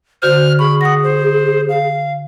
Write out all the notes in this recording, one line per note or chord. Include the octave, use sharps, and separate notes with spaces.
D3 F#4 C5 F6 G6
G#4 B5 C#6
F#5 D#6 A#6
C5
F5